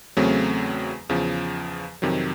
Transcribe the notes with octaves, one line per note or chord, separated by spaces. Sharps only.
E2 C#3 F#3 A3 C4
E2 C#3 F3
F2 C3 D#3 F#3